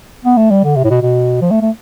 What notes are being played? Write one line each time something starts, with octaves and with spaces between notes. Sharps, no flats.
B3
A3
G3
D3
C3
A2
B2
B2
F3
A3
A3